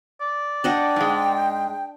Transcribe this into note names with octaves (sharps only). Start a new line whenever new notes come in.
D5
D4 D#5 F#5 G5
G#2 G#3